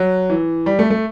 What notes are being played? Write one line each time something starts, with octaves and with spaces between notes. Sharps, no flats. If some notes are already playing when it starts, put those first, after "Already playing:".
Already playing: F#3
E3
G3
A3
A3